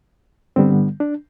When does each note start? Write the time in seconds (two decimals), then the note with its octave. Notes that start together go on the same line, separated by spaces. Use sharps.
0.56 G2 D3 G3 B3 C4
1.00 D4